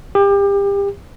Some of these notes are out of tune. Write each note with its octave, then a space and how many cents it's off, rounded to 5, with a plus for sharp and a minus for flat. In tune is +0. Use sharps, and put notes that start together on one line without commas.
G4 +30